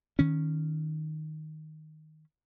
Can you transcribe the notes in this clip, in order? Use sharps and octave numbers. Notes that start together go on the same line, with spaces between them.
D#3 C#4